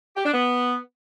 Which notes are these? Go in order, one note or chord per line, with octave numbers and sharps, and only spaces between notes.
G4
D4
B3